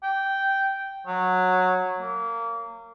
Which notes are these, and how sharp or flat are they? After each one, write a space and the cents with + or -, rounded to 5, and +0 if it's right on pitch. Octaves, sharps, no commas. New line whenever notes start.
G5 -10
F#3 -10
A#3 -20